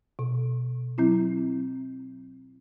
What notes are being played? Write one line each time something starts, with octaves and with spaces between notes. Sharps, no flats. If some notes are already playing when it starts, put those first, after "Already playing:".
B2
F#3 C4 E4